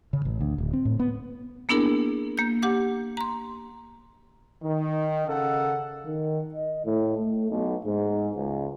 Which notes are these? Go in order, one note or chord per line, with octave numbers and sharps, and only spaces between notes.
C#3
A1
D2
D1
C4
A2
B3
A#3 B3 D4 E4 G#4 A#4
A#3 G6
G4 F#5 D6
A#5 C6
D#3
C#3 A4 A#4 D#5 F5 F#5
D#3
D#5
A2
A3
B1
G#2
C#2